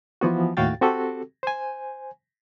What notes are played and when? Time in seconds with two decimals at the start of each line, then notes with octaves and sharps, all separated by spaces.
0.21 E3 F3 B3 F#4
0.57 D#2 A2 F#4 F5 G5 A6
0.81 C4 F#4 G4 A4
1.43 C5 G#5